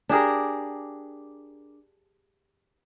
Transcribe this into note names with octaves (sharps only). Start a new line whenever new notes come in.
D4 G4 G#4 A#4